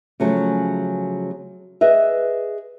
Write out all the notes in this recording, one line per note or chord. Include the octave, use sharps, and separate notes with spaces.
C#3 F3 F#3 A3 C#4
G#4 B4 D#5 E5